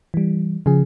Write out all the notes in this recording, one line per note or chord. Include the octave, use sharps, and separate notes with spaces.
E3 G3
C#3 F3 G#4